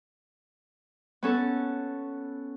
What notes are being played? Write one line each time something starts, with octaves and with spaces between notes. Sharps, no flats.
B3 C#4 A4